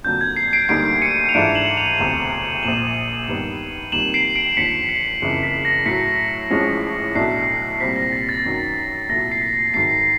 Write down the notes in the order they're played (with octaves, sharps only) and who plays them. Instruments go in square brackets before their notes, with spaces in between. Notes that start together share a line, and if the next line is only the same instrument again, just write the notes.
[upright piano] F2 D3 F#3 A#3 [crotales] G6
[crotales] G#6
C7
C7 D7
[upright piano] D2 D3 G3 A#3 D#4 [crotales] C7 D7
[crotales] C#7 D#7
F7
[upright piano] G#2 E3 A3 D4 F4 [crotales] D7 E7
[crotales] E7 F#7
F#7
D#7 F7
[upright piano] E1 D2 C3 [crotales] E7 F#7
[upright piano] A#1 A#2 F3 [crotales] E7 F#7
[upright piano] G2 D#3 G3 B3
[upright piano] F2 C3 D#3 G3 A#3 [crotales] E7 F#7
[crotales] C7 D7
C7 D7
[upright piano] D#2 D3 F3 [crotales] B6 C#7
[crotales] C7
[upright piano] F#1 F2 C#3 E3
[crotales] B6
A#6
[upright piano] A2 F#3 A3 [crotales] B6 C#7
[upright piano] A1 A2 F3 G#3 C#4
[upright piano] B1 A2 F#3 A3 D4 [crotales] C7
[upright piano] C2 A#2 G3 C4 [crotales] B6
[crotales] A#6
A6
A6
[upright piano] F#2 D#3 F#3
[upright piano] C2 A#2 F#3 A3 [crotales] A#6
[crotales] C7
B6
[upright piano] G#2 D#3 F#3 A3 [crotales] C7